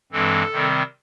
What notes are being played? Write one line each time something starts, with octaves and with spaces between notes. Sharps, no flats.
G2 E3 G#3 C4 A4
C3 D#3 G3 C4